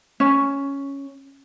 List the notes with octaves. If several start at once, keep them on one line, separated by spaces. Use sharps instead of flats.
C#4